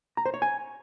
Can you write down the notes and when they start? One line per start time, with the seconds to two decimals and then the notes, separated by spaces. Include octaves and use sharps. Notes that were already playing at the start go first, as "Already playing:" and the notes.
0.17 A#5
0.26 C5
0.34 C#5
0.42 G#5